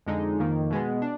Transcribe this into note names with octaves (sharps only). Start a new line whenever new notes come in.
F2 D3 G#3 D#4
F2 D#3 A#3
B2 G#3 B3
D4